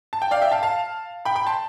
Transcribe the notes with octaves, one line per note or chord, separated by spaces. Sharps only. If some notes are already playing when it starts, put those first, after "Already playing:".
A5
G5
D5 F5
E5 G5
F5 A5
F5 A5
G5 B5
G5 B5
A5 C6